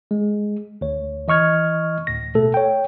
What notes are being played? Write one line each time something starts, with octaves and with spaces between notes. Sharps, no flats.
G#3
D2 C#5
E3 D#5 C#6 F6 G#6
D2 A2 A#6
B2 A3 A4
C#5 G5